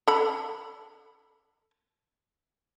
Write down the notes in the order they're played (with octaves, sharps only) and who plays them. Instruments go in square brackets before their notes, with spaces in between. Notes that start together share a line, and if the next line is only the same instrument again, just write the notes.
[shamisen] A4 B5